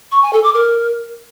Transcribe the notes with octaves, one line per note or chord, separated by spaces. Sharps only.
C#6
G#5
A4
D6
A#4